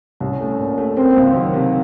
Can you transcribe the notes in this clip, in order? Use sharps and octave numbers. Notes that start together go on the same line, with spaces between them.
C2 C#4
A3
A#2
A3
A#3 C4
C#2
D#3 F#3
C3